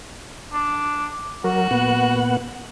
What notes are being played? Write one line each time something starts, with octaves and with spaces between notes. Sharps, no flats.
D4
F#3 F#4 A#4
A#2 B3 F#5